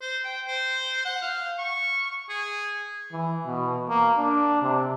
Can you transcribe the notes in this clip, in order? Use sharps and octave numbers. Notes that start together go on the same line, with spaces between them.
C5
G5
C5
F#5
F5
C#6
G#4
E3
B2
A#3
D4
C3